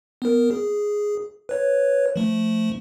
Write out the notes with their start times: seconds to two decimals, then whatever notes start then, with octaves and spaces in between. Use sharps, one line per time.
0.22 B3 A#4
0.51 G#4
1.49 B4 C#5
2.16 F3 A3